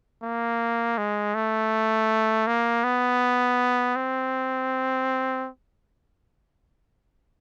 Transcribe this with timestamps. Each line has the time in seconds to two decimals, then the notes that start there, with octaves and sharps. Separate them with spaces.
0.23 A#3
0.98 G#3
1.35 A3
2.47 A#3
2.84 B3
3.96 C4